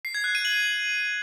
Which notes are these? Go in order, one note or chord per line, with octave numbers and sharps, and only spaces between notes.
C7
G#6
F#6
D#7
F#7